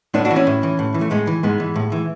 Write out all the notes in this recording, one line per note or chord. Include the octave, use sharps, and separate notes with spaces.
A2 B3 D4
D4 F#4
E3
C#4 E4
A2
E3
A2
E3
A3
A2 G#3 B3
E3
G#2 G#3 B3
E3
A2
E3